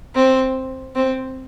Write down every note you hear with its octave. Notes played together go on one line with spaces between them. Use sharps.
C4
C4